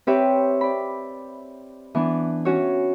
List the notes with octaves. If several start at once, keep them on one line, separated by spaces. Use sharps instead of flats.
C4 G4 B4 C#5 E5
D5 B5
E3 B3 D4
C#4 F#4 C#5